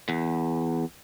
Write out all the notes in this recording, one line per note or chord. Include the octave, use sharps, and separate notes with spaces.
E2